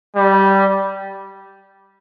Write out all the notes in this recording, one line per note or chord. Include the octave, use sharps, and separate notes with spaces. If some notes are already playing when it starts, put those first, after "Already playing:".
G3